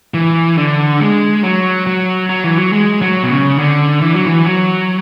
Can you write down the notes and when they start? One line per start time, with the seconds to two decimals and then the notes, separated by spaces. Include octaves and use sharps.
0.14 E3
0.57 D3
1.00 G#3
1.43 F#3
1.87 F#3
2.29 F#3
2.44 E3
2.58 F#3
2.73 G#3
3.02 F#3
3.23 B2
3.30 C#3
3.58 D3
4.01 E3
4.14 F#3
4.26 E3
4.45 F#3